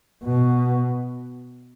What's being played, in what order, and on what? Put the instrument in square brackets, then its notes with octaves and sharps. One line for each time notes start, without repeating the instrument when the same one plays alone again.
[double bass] B2